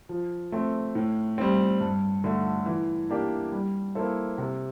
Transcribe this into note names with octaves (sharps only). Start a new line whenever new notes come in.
F3
A3 C4
A2
G3 C4
G2
D3 A3
E3
A#3 D4 G4
G3
A#3 E4 A4 C5
C3